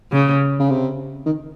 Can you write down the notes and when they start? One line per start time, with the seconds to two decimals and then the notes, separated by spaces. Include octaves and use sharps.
0.12 C#3
0.59 C#3
0.70 C3
1.26 D#3